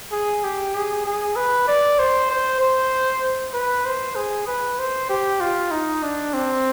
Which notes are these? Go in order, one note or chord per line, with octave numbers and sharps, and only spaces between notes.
G#4
G4
G#4
G#4
B4
D5
C5
C5
C5
B4
C5
G#4
B4
C5
G4
F4
D#4
D4
C4